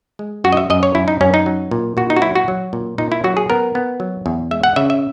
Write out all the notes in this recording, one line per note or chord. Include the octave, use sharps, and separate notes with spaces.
G#3
F#2 F#4
D#5
E5
F#2 D#5
C#5
F#2 E4
D#4
F#2 C#4
D#4
F#3
A#2
A#2 F#4
D#4
F#4
F#3 E4
F#4
F#3
A#2
A#2 D#4
E4
F#3 F#4
G#4
B3 A#4
B3
F#3
E2
G#3 E5
F#5
C#3 E5
E5